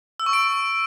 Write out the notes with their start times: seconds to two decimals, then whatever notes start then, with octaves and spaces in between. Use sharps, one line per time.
0.20 E6
0.26 C#6
0.33 D7